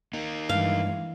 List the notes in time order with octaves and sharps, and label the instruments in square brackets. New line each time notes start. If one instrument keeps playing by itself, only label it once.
[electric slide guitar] A#3 D#4
[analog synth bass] G2 [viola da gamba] E3 G#3 [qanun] F5